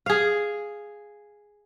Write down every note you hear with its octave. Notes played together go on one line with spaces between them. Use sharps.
G#4 F5